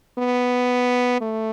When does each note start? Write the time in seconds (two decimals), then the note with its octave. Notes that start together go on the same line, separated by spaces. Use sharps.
0.19 B3
1.21 A3